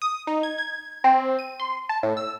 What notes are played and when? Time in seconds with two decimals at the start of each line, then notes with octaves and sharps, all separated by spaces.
0.02 D#6
0.27 D#4
0.43 G#6
0.58 G#6
1.04 C4
1.39 D#7
1.60 C6
1.89 A5
2.03 A2
2.17 E6